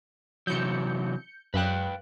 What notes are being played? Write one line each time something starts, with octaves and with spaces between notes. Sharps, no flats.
C3 E3 F#3 G6 C#7
F#2 B4 F5 G5 F#6